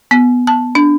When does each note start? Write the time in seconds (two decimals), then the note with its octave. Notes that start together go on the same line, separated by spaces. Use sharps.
0.11 B3
0.47 A5
0.75 D4